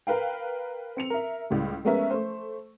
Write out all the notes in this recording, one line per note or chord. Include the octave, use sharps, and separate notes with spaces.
A#4 B4 F5 G5
C4 C#7 F7
A#4 E5
C#2 A2 G3 A3
G#3 A3 B3 C#4 A#4 E5
A3 C5